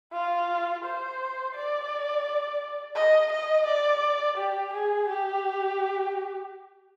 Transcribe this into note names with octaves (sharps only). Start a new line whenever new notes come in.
F4
C5
D5
D#5
D#5
D5
G4
G#4
G4